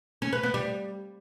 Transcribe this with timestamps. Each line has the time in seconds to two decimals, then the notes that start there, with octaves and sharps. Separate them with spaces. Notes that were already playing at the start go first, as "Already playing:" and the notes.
0.22 C#4
0.33 B4
0.43 B3
0.54 G3